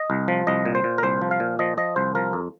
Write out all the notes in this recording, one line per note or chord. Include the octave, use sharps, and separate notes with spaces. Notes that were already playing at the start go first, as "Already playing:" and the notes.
Already playing: D#5
C2
F3
C2 D#5
A#2
C5
A#2
A#4
C2 C5
F3
F5
A#2
F3 D#5
F3 D#5
C2 C5
F3 A#4
F2